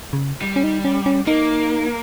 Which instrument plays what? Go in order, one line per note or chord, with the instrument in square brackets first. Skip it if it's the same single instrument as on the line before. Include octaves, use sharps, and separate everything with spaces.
[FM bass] C#3
[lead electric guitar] G3
[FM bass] C#4
D#4
C#4
C#4
[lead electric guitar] A#3 [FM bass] D#4